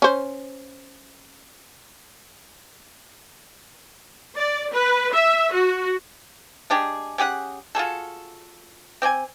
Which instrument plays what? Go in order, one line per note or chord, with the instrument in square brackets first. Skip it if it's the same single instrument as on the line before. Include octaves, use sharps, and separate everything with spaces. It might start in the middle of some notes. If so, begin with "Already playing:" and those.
[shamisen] C#4 C5
[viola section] D5
B4
E5
F#4
[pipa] G#3 D4 G4 G#4
C#4 G4 G#4 F#5
F4 F#4 G#4 A4
C4 D5 G5 G#5